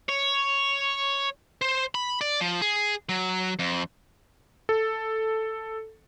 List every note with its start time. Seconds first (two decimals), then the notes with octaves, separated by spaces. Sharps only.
0.09 C#5
1.62 C5
1.95 B5
2.21 D5
2.41 F3
2.62 G#4
3.09 F#3
3.59 F2
4.69 A4